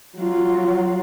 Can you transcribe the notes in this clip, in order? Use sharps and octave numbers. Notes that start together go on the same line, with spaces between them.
F#3 F4